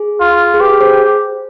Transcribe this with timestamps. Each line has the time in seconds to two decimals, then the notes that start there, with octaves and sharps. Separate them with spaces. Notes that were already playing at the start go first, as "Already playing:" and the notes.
Already playing: G#4
0.20 F4
0.54 G#4
0.60 G4 B4
0.81 G#4 C5